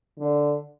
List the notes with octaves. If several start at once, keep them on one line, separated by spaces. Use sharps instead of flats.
D3